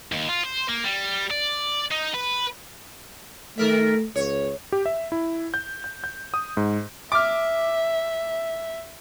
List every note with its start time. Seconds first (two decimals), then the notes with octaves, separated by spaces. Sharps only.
0.12 D#2
0.29 F4
0.44 C5
0.69 A#3
0.84 G3
1.31 D5
1.91 D#4
2.14 B4
3.58 D#3 A3 A#4 E5
4.16 C#2 C#5
4.72 G4
4.86 E5
5.12 E4
5.54 G6
5.84 G6
6.04 G6
6.34 D#6
6.57 G#2
7.12 E5 D6 F6